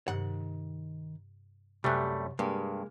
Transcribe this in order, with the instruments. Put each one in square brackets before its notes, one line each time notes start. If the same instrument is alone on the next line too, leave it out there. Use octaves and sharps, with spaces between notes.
[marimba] G2 C3 [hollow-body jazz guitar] D#3 F#5
[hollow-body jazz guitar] C2 F#2 [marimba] C3 G#5 F#6 [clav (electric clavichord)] G3 A3
[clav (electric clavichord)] G2 [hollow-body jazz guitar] G#3 A#3